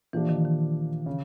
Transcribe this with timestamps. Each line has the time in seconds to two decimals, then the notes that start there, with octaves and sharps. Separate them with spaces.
0.13 A#2 E3 F3 A#3 D4 G4
0.29 D#3
0.45 D#3
1.06 C#3